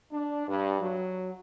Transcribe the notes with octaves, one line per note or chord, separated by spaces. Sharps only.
D4
G2
F#3